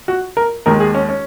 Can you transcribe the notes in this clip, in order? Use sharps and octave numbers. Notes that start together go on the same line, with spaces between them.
F#4
A#4
D#2 D#3 G#3 A#4
G#4
C#4
C#4